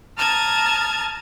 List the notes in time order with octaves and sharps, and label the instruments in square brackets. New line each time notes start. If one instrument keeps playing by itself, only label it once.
[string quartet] A5 A#5 D#6 F6 G#6 A6